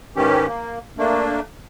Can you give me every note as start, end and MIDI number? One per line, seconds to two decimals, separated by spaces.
0.16 0.47 44
0.16 0.47 51
0.16 0.47 52
0.16 0.47 61
0.16 0.47 67
0.47 0.79 58
0.98 1.40 57
0.98 1.40 58
0.98 1.40 62